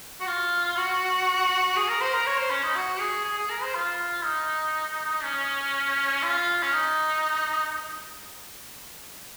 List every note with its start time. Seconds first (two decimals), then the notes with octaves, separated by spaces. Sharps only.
0.20 F#4
0.27 F4
0.77 F#4
1.76 G#4
1.89 A#4
2.01 C5
2.13 A#4
2.26 C#5
2.38 C5
2.50 C#4
2.63 D#4
2.75 F#4
3.00 G#4
3.25 G#4
3.38 G#4
3.50 A#4
3.62 C5
3.75 F4
4.24 D#4
5.23 C#4
6.23 F4
6.63 C#4
6.72 D#4